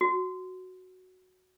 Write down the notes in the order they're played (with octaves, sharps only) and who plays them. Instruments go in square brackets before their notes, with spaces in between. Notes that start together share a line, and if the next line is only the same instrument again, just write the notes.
[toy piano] F#4